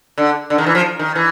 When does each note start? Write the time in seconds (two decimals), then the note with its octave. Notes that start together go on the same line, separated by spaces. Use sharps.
0.18 D3
0.50 D3
0.58 D#3
0.66 E3
0.75 F3
0.99 D#3
1.15 E3